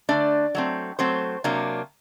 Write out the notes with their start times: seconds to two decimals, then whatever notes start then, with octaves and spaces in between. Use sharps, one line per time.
0.09 D3 A3 D4 D5
0.55 F#3 A3 C4
0.99 F#3 A3 C4 C5
1.44 C3 F#3 A#3 D4